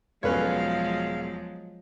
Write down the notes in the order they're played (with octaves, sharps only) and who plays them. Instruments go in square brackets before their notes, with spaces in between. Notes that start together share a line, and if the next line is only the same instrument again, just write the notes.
[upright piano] E1 [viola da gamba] F3 F#3 G#3 [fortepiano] C#4 B4 C#5 [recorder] F5